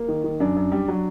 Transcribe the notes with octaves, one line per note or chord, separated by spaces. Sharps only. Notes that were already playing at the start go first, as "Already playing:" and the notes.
Already playing: A#3
D#3
D#3
F#2 D4
F#2
G3
F#3